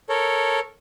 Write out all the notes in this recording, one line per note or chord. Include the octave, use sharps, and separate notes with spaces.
A4 A#4 C#5